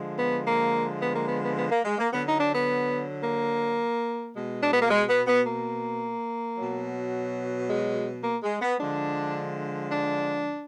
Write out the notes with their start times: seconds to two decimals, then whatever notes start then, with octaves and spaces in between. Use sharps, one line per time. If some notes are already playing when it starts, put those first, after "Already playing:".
Already playing: D3 F3 G#3
0.17 B3
0.46 A#3
1.01 B3
1.15 A#3
1.28 B3
1.43 B3
1.57 B3
1.70 A#3
1.84 G#3
1.98 A#3
2.12 D3 F#3 B3
2.26 D#4
2.40 D4
2.54 B3
3.23 A#3
4.34 B2 G#3
4.63 D4
4.71 B3
4.81 A#3
4.90 G#3
5.09 B3
5.27 B3
5.45 A#3
6.57 B2 F#3
7.68 G#3
8.23 A#3
8.43 G#3
8.61 B3
8.79 D3 F3 G#3 D4
9.91 D4